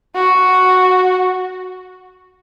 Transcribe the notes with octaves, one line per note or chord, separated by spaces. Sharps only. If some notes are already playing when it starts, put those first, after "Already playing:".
F#4